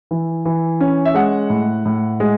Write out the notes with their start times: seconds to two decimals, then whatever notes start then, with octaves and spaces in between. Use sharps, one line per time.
0.11 E3
0.45 E3
0.80 C#4
1.05 E5
1.14 G#3 F#5
1.50 A2
1.85 A2
2.20 G#3